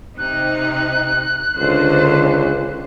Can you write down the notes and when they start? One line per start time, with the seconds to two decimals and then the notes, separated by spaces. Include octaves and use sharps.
0.18 C3 D#4 F#6
1.59 C#2 D3 C5